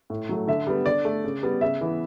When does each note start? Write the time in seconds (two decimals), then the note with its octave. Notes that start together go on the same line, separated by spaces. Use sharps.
0.10 A2
0.29 F#3 A3
0.47 D3 E5
0.67 G3 B3
0.86 D3 D5
1.05 A3
1.24 C#3
1.43 G3 B3
1.61 C#3 E5
1.81 E3 B3